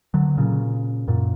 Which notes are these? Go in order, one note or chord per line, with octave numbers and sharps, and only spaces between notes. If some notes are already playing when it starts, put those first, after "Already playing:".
D3 F#3
A#2 C#3
F#2 A#2